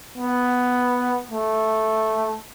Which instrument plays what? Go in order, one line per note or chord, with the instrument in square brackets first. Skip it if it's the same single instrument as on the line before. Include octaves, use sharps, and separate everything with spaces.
[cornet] B3
A3